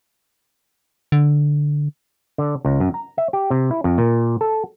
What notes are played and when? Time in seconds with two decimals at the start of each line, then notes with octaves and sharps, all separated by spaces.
1.12 D3
2.38 D3
2.65 C#2
2.80 F#2
2.94 A#5
3.18 E5
3.33 G4
3.51 C3
3.71 E4
3.84 F2
3.98 A#2
4.41 A4